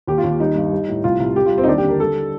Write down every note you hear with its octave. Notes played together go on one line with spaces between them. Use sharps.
D#2 G4
F4
D#2
G3 D#4
G2
G3
A2
C2 F4
C2
G3 G4
F4
G3
C4
D#4
D#2 D4
G4
D3 A#4
G3 A4